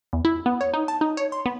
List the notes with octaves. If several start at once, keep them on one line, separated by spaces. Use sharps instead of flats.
E2
E4
B3
C#5
D#4
A5
D#4
C#5
C6
B3